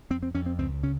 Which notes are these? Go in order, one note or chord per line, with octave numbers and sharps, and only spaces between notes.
F2 C4
C4
F2 C#4
C4
C#2 C4
C#3 C#4